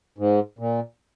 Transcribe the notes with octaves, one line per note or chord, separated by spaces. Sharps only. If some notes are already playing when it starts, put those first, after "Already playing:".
G#2
A#2